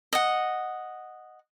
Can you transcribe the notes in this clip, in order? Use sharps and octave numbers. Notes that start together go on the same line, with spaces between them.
D#5 F#5